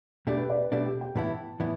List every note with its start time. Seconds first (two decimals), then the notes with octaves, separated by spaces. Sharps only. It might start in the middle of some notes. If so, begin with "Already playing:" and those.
0.27 B2 A3 D4 G4
0.38 B4
0.50 D5
0.60 B4
0.71 B2 A3 D4 G4
0.86 G4
1.01 G5
1.16 A2 E3 B3 E4 A5
1.60 A2 E3 B3 E4